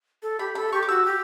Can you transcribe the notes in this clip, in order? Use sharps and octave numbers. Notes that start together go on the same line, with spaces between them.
A4
G4 B5
A4 B5
G4 C#6
D6
F#4 E6
G4